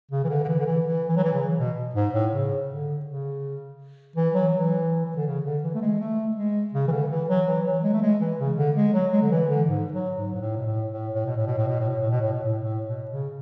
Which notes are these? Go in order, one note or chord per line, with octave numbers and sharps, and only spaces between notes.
C#3
E3
D3
D3
E3
D3
E3
E3
E3
F#3
E3
C#3
B2
G#2
A2
C#3
D3
C#3
E3
F#3
E3
E3
D3
C#3
D3
E3
A3
G#3
A3
G#3
C#3
E3
D3
E3
F#3
E3
F#3
G#3
A3
G#3
E3
C#3
D3
G#3
F#3
G#3
D3
E3
D3
G#2
F#3
G#2
G#2
A2
B2
A2
A2
A2
B2
A2
B2
A2
B2
A2
B2
A2
B2
A2
B2
A2
A2
B2
C#3